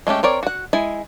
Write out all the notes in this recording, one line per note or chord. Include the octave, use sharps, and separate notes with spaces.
G#3 A3 C#4 G4
C4 A#4 C#5 D5
F#4 F#5
G#3 E4 G#5